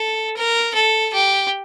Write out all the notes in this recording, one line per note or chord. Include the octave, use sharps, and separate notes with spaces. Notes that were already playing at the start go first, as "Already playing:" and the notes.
Already playing: A4
A#4
A4
G4